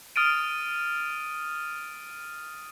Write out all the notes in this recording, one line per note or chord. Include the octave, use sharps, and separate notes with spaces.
D#6 F6 A6 D7 D#7